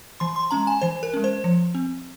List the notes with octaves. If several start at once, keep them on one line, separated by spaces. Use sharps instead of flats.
E3 C6
C6
G#3 C#4 A#5
G#5
E3 C5
A#4
G#3 C#4
C5
F3
C4